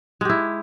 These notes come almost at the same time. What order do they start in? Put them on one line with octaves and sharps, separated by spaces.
G#3 G4 E4